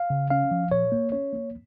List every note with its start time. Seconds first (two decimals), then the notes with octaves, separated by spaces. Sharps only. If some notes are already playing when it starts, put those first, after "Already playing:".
Already playing: F5
0.10 C#3
0.30 C#4 F5
0.51 F3
0.71 A#2 C#5
0.92 A#3
1.12 C#4 C#5
1.33 A#3